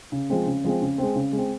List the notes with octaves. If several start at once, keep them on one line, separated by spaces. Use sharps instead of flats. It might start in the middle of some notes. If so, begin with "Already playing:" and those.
C#3
F3 G#3 C4
C#3
F3 G#3 C4
C#3
G#3 C4
C#3
G#3
C4